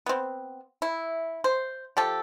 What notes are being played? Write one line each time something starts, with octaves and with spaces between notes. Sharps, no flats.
B3 C4
E4
C5
F3 G4 A4